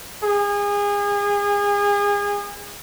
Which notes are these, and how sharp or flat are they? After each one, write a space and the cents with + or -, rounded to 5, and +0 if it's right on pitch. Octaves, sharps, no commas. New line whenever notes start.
G#4 -30